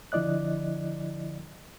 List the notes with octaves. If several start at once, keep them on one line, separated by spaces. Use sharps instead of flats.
D3 F3 E4 D5 D#5 F#6